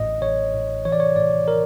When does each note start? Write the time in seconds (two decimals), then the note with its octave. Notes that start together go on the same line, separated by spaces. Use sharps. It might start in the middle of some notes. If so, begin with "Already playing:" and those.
Already playing: A1 A2 D#5
0.21 A1 C#5
0.54 A2
0.85 E3 C#5
0.92 D5
1.00 C#5
1.16 A2 D5
1.48 A#4